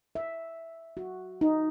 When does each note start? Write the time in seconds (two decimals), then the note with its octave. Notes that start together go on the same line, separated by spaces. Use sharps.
0.15 E5
0.97 F#4
1.41 D#4